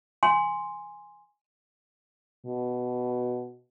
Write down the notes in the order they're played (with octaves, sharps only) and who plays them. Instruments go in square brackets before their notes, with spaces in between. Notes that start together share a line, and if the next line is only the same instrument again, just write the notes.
[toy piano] G#5 C6
[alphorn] B2